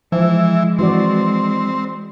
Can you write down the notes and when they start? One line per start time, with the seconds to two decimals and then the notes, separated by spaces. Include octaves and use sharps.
0.12 E3 F3 G#3
0.79 E3 C4 F#4 D5